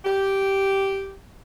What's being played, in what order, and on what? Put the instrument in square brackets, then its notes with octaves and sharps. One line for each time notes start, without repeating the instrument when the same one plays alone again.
[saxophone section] G4